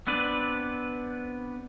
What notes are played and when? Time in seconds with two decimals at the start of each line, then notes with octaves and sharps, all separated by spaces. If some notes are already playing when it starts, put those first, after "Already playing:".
0.07 B3 C4 D4 B4 D5